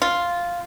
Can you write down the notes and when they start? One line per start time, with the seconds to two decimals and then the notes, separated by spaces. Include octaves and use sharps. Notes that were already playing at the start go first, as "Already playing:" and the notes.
0.02 F4